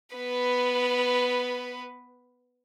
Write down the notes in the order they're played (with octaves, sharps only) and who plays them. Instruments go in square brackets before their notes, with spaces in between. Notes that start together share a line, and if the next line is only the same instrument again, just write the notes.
[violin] B3 B4